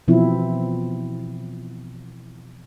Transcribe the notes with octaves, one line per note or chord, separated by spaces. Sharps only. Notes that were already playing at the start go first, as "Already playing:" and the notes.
B2 E3 F3 C4 E4